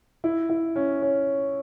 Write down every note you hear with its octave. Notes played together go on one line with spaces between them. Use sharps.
E4
E4
C#4
C#4